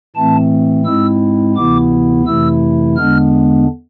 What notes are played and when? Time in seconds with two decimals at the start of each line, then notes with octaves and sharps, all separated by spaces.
0.16 A2 E3 A3 C4 A5
0.85 G#2 G#3 C4 E4 E6
1.56 D2 C3 E3 B3 E4 D6
2.26 F2 C3 E3 A3 E4 E6
2.96 E2 D3 G#3 B3 D4 F6